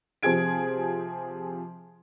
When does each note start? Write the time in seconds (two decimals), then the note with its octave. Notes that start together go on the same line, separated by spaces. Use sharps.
0.23 C3 F3 G4 G#4 G#6 D7